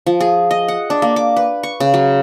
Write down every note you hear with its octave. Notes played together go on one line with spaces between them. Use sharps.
F3
G#4
D#5
F#5
D4
A#3
D6
B4
C#6
C#3
F#3